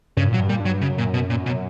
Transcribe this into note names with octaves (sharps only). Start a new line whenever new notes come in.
G2 C#3
A#2
F#3
G2
A#2 G3
G2
F#3
F#2 C#3
A#2
B2
A#2
B2